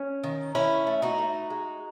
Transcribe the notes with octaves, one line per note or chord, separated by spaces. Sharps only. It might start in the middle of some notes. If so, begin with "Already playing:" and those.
Already playing: C#4
D#3
D#3 C#4 E4
A3
D#4 F#4
A3
G#3